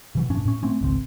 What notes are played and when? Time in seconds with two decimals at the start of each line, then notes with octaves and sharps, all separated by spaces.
0.15 C3 E3 F#3
0.29 F1 G#2 C#4 D4
0.45 A2 C#4
0.63 A3 C4 C#4
0.81 G#1 C#2 C4